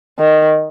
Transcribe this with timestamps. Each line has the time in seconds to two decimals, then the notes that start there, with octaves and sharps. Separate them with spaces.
0.19 D#3